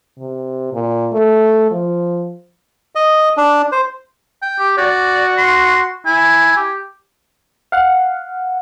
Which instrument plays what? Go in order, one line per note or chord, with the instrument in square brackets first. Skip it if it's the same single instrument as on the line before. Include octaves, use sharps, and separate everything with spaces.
[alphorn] C3
A#2
A3
F3
[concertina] D#5
D4
C5
[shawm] G5
[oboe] G4
[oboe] F#4 [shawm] D5
[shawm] C6
[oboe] E4 [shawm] G#5
[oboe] G4
[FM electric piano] F5 F#5